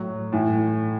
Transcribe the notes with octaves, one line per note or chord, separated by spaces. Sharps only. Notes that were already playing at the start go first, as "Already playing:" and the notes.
Already playing: A2 F#3
A2 E3